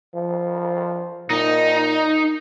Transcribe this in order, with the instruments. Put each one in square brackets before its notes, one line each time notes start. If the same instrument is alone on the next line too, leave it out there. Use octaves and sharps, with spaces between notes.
[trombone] F3
[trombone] A#2 [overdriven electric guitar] D#4